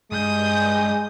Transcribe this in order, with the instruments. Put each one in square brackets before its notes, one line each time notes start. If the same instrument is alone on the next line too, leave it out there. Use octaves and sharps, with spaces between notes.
[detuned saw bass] G2 [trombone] G#3 [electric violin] D#6 G6